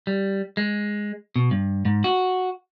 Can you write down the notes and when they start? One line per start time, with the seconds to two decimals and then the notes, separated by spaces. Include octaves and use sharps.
0.07 G3
0.57 G#3
1.36 B2
1.51 G2
1.85 G#2
2.04 F#4